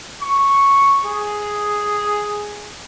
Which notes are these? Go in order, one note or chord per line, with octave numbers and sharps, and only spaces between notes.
C#6
G#4